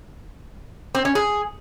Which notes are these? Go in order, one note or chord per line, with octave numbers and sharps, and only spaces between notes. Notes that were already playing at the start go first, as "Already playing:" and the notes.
C4
C#4
G#4